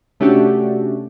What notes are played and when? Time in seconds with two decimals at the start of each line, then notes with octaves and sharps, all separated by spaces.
0.20 C3 A3 C#4 D4 F#4 G4